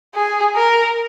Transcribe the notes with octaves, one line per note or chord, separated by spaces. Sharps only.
G#4
A#4